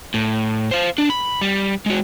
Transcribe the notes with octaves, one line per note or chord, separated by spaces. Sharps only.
A2
C5 F5
D4
B5
G3
G#3 F#4